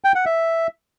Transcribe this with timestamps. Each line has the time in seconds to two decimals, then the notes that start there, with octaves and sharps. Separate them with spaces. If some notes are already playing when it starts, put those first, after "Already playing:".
0.04 G5
0.15 F#5
0.26 E5